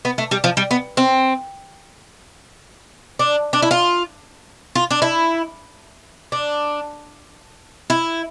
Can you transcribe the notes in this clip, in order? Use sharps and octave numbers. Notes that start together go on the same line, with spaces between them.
B3
A3
G3
F3
G3
B3
C4
D4
D4
E4
F4
F4
D4
E4
D4
E4